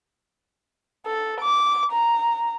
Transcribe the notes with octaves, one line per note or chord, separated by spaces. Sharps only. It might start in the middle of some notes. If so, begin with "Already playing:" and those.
A4
D6
A#5